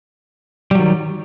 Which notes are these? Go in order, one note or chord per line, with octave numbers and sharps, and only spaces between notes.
D#3 F#3 G3